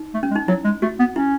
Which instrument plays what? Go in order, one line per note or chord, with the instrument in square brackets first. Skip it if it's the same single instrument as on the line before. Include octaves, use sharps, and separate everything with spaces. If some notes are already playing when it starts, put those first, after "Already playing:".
Already playing: [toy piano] D#4
[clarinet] A3
[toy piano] C#4
[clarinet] G#3
[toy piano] D#4
[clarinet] F#3 [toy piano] E4
[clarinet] G#3
[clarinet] A3 [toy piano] F#4
[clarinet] B3
[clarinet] C#4 [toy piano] E4